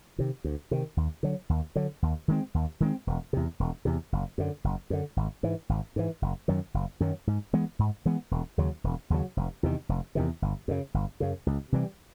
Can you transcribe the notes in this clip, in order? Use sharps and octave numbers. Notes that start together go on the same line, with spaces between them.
C3 D#3
D2
C3 D#3
D#2
D3 F#3
D#2
D3 F#3
D#2
D#3 G#3 C4
D#2
D#3 G#3 C4
E1
E2 C3
E1
E2 C3
F#1
F#2 D3
F#1
F#2 D3
G#1
G#2 E3
G#1
G#2 E3
F#1
F#2 D#3 F#3
F#1
F#2 D#3 F#3
G#2
E3 G#3 B3
G#2
E3 G#3 B3
E1
D#2 C#3 F#3
E1
D#2 C#3 F#3
F1
E2 C3 D#3
F1
E2 C3 D#3
G1
F#2 C#3
G1
F#2 C#3
C#2
C3 E3 G3